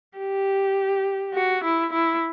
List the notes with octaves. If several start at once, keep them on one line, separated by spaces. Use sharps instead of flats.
G4
F#4
E4
E4